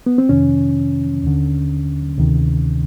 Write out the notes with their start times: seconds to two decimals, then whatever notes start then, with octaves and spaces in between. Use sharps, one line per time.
0.06 B3
0.18 C4
0.29 F2 C3 D#3 C#4
1.24 D#2 D3
2.18 D2 C3 D#3